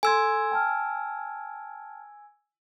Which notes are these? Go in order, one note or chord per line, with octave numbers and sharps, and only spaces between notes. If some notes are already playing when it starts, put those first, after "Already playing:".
A4 G#5 C6 E6 G#6
G5 A5 F6